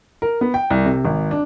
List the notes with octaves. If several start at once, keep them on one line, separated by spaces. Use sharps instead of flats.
A#4
B3
G5
C2
C3
G#1
D4